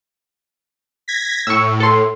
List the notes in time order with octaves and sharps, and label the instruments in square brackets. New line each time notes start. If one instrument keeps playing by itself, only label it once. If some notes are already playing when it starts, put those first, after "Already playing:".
[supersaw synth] G#6 A#6 B6
[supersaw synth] A2 [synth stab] C#6 E6
[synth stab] A4 C6